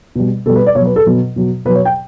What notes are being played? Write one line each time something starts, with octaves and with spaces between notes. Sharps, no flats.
B2 G3
B2 G3 A4
B4
D5
B2 F#3 C#5
B4
A4
B2 F#3
B2 F#3
B2 F#3 B4
C#5
G5